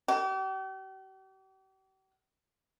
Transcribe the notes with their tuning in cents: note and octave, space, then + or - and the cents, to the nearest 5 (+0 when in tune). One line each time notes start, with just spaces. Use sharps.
G4 -40